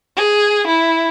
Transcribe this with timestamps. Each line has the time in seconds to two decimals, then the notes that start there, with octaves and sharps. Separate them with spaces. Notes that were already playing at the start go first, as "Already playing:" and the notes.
0.17 G#4
0.67 E4